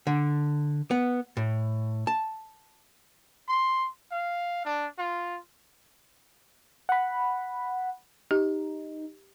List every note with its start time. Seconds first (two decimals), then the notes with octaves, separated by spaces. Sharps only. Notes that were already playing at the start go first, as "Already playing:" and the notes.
0.07 D3
0.91 B3
1.37 A2
2.07 A5
3.48 C6
4.12 F5
4.65 D4
4.98 F4
6.89 F#5 B5
8.31 D#4 G4